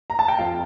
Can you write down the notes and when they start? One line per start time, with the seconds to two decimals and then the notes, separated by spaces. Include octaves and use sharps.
0.10 A#5
0.19 A5
0.28 G5
0.38 F2 F4 F5